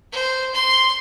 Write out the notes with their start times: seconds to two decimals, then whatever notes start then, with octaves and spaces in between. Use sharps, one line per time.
0.13 C5
0.55 C6